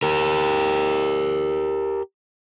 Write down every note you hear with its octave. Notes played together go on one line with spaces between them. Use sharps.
G4 A#4